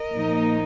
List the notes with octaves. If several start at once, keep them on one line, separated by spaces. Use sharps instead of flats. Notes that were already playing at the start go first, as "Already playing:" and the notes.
Already playing: A#4 D#5
A#2 F3 A#3 D#4